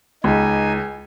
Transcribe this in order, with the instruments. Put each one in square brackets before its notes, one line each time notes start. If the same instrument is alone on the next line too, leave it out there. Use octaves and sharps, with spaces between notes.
[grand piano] C#2 [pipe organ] D#4 G#5